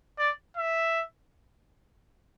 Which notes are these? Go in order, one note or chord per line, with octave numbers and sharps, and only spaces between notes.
D5
E5